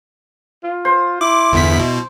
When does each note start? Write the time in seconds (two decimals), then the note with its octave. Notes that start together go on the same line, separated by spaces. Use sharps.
0.63 F4
0.85 C5
1.21 E4 D6
1.52 G1 E2 B6
1.80 B2